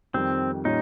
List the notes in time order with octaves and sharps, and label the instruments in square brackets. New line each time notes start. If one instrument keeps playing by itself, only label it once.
[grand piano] F2 D#3 G3 [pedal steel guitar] C4
[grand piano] A#2 G3 C#4 F4 [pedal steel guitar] D#4